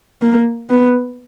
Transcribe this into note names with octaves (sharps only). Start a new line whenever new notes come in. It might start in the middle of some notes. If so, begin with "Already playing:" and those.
A#3
B3